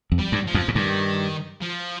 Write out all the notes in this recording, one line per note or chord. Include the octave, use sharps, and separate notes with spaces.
F2
G3
G2
F3
F2
G#2
G2 D#3
F3